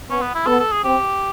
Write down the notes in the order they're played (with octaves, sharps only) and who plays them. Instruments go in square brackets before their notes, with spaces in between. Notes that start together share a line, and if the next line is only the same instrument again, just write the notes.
[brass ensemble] B3 [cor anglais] C#4
[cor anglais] B3
E4
[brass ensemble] B3 [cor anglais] A4
[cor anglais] A4
G#4
[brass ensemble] C4 [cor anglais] G4